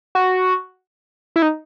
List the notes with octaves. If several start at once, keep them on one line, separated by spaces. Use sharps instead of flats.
F#4
E4
D#4